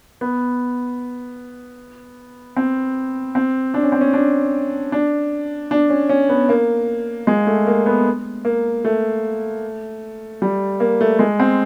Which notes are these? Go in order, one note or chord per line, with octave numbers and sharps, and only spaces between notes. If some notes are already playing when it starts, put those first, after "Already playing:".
B3
C4
C4
D4
C#4
C4
C#4
D4
D4
D4
C#4
C#4
B3
A#3
G#3
A3
A#3
B3
A#3
A3
G3
A#3
A3
G#3
C4